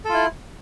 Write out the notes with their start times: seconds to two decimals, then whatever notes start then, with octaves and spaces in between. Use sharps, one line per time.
0.05 A4
0.09 F4
0.14 E4